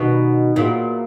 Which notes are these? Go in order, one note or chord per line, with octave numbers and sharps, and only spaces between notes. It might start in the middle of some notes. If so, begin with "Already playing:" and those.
Already playing: B2 D#3 G3 B3 D#4
A#2 F#3 B3 E4 G#4